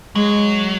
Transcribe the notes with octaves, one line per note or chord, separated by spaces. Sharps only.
F#3 G#3